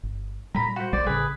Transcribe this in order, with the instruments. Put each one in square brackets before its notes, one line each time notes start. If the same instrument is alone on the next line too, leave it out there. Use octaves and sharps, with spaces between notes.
[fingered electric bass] G1
[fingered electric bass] A#2 G3 [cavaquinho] A#5 B5
[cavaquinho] F#4 C5
[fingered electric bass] A#1 G3 [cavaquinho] C5 D5
[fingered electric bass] A1 C#3 [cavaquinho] G#4 B4 D#6